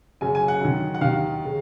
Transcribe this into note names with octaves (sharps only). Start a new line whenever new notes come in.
F#2 C#3 G#5
G#5
F#5
F#2 D#3
F#5
D#2 D#3 F5
C#3